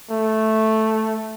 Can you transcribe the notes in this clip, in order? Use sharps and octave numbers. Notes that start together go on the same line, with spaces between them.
A3